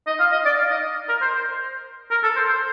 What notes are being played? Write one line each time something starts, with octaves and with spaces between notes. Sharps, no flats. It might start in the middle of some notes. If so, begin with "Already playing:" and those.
D#5
F5
D#5
D5
F5
D#5
A#4
C5
C5
A#4
A4
C5
C5